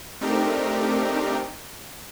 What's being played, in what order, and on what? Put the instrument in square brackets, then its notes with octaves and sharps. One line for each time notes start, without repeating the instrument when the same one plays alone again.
[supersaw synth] A3 C4 D4 D#4 G4 A#4